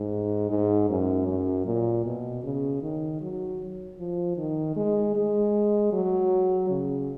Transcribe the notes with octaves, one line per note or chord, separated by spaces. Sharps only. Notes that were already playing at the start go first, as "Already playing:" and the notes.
Already playing: G#2
G#2
F#2
F#2
A#2
B2
C#3
D#3
F#3
F3
D#3
G#3
G#3
F#3
C#3